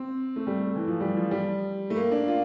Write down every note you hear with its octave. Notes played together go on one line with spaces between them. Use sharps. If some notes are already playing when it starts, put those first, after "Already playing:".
Already playing: C4
A3
G3
A3
E3
F3
G3
F3
G3
A3
A#3
D4
F4